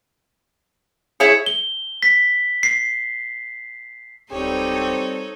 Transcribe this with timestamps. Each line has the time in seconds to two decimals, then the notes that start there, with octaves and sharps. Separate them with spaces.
1.20 E4 G#4 C#5
1.46 G7
2.03 B6
2.63 C7
4.31 D1 G3 C4 D#4 G4 A4 C#5